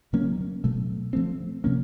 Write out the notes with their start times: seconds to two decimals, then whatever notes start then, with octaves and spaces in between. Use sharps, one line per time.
0.13 C#3 F#3 A#3 C#4
0.64 B2 F#3 A3
1.13 F3 A3 C4
1.64 C3 F3 A#3 C#4